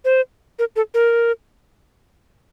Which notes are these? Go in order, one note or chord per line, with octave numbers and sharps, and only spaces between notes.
C5
A#4
A4
A#4